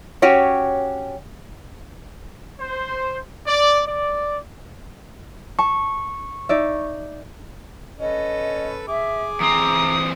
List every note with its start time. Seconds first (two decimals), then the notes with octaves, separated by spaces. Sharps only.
0.22 C#4 F#4 G4 C#5
2.60 C5
3.47 D5
3.86 D5
5.59 A5 C#6
6.49 D#4 D5 E5
8.00 C#4 A4 B4 D#5
8.88 G#4 E5 D6
9.40 E2 C4 A#5 D#6